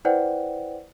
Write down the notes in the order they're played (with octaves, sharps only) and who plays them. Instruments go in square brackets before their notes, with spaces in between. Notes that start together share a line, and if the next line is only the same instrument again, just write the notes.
[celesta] E4 B4 C5 D5 F#5 G5